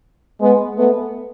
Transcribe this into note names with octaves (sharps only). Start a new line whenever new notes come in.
G#3 B3
A3 B3